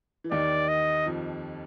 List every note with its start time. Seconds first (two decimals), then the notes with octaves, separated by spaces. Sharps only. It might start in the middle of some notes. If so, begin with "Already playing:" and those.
0.24 E3
0.31 D#2 D#3 D5
0.68 D#5
1.06 F2 F3